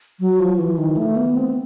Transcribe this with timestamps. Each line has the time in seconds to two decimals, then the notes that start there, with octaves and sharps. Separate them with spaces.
0.20 F#3
0.39 F3
0.59 E3
0.78 D#3
0.97 A3
1.16 B3
1.36 C4